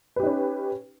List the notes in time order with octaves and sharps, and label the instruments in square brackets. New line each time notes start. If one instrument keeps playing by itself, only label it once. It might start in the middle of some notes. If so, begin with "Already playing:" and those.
[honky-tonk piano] B4
G4
D#4
C#4